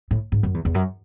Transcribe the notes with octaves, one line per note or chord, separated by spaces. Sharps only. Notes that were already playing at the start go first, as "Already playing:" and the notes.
A2
G#2
F#2
E2
E2
F#2